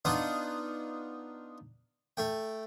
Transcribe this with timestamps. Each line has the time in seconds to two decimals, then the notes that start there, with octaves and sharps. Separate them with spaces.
0.05 B3 D4 D#4 F4 F#5
2.17 A3 G5